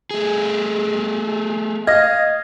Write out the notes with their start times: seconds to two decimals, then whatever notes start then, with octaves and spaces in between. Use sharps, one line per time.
0.11 A3 G#4
1.87 D#5 F5 G#6 A#6